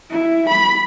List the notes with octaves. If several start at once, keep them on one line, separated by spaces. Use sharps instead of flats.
E4
B5